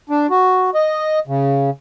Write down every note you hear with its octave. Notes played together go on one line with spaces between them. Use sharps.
D4
F#4
D#5
C#3